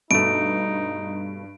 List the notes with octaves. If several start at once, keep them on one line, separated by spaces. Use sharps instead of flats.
G2 B2 A3 D#4 D7